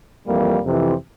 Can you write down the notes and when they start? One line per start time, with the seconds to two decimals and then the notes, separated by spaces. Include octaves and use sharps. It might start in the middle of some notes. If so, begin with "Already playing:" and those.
0.26 F2 E3 G3 A#3
0.63 F2 C3 E3